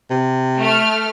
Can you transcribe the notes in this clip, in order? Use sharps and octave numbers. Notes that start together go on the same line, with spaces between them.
C3
A3 F6